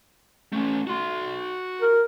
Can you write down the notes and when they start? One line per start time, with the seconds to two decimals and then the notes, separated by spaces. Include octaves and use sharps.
0.53 A3 C#4
0.87 F#4 C6
1.82 A#4